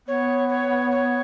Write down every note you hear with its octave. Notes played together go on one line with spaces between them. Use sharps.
B3 C#5
C#5
C#5